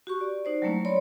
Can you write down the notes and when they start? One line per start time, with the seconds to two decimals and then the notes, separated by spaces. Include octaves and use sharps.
0.07 F#4 G4 C#6
0.21 D5
0.45 D#4 C5 D5
0.62 F#3 G3 A3 A#3 C#4 E4
0.85 C#5 D5 B5 C6